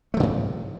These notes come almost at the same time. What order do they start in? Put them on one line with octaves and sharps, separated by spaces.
A3 F3 C#3 G#2